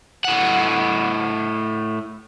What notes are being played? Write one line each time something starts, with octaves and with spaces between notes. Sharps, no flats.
A2 F#5